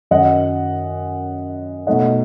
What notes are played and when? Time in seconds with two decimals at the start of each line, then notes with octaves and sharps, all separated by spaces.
0.11 F#2 D#3 F#3 C#4 D#5 F#5
1.87 B2 F#3 A3 D#4 D#5 F#5